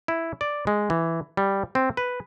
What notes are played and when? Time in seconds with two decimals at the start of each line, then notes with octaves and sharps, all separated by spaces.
0.08 E4
0.41 D5
0.67 G#3
0.90 E3
1.37 G3
1.75 C4
1.97 B4